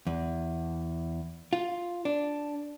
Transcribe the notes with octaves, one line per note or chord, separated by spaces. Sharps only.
E2
F4
D4